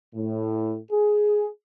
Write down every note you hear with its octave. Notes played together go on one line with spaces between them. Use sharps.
A2
G#4